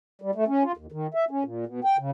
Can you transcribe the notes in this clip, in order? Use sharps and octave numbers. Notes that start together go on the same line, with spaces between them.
G3
A3
C#4
F4
D#2
D#3
E5
C#4
A#2
B2
G5
C#3